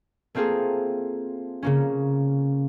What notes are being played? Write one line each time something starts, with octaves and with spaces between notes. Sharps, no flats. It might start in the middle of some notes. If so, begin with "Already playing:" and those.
A3 A#3 C4 F4 G#4 A4
C#3 A#3 C#4